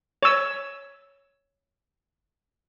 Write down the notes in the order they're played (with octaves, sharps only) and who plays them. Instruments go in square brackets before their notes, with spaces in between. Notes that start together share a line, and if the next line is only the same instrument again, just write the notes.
[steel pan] C#5 E6